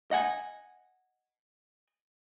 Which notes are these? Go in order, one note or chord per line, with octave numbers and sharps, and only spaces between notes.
D#5 F#5 G#5